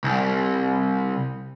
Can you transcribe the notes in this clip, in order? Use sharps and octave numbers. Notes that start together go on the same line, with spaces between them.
C2